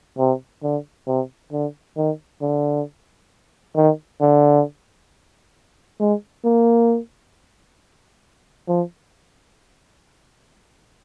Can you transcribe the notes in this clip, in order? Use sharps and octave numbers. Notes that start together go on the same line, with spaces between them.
C3
D3
C3
D3
D#3
D3
D#3
D3
G#3
A#3
F3